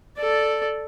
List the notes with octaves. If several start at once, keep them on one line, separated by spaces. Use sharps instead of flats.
A4 D5